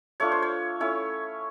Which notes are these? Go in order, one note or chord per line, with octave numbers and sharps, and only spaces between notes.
A3 D4 F4 C#5
C5
C#5
A3 C#4 E4 C#5